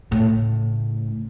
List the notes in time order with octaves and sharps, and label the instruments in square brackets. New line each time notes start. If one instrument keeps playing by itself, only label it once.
[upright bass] A2 C#3